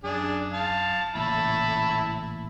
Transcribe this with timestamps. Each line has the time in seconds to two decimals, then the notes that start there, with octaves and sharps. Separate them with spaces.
0.04 F#2 D4 G#4
0.54 F5 A5
1.15 A1 A#2 C#3 E4 A5 B5